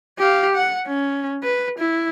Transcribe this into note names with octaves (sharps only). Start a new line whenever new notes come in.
G4 F5
F#5
C#4
B4
E4